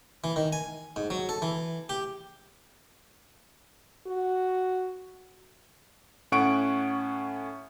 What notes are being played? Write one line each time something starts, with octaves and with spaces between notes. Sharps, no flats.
E3
D#3
G#5
G#2
F#3
A4
E3
G4
F#4
A2 C#4 F#5 C#6 D7